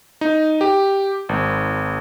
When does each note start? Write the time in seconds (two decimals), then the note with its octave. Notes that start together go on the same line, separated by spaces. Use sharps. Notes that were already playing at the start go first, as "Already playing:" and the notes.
0.21 D#4
0.61 G4
1.29 G#1